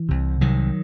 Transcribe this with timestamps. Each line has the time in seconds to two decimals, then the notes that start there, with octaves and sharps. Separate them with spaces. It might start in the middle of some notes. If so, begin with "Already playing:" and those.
Already playing: E3
0.09 C2 C3
0.41 C2 C3 D#3 F#3